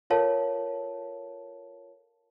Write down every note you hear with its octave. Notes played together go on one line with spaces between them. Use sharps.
F4 A4 A#4 C#5 F5 A5